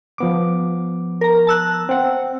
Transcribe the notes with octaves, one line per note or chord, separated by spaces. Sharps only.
F3 B3 D6
A#4 A#5
A5 E6 F#6
C4 F#5